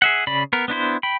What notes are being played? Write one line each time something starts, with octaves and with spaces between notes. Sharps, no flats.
G#4 E5 F#5
C#3 D5 B5
B3 A#4
B3 D4 E4 C5
G5 B5